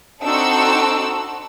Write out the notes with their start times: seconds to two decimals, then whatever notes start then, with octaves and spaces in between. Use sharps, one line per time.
0.25 C4 D4 D#4 F#4 A4 E6